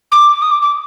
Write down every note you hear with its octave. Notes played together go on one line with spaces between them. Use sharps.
D6
D#6
D6
D6